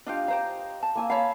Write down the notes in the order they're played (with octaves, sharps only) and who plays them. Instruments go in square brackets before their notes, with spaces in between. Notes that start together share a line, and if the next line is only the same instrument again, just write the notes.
[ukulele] D4 F4 G4 [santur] D#5 F5
[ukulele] G4 C5 F5 [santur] A#5
[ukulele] A5
[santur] A#3 G#5 E6
[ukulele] C#5 F5 [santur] A5 B5